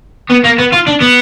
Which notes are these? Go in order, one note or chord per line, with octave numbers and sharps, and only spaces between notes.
B3
A#3
B3
F4
D4
B3